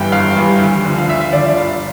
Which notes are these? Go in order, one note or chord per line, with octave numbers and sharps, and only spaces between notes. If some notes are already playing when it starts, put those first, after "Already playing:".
Already playing: G1 G2 E3 G3 G5
G1 F5
G2 E3 G3
D2
D3 F3
F5
D2 E5
E5
D3 F3 D5
E5
G1 F5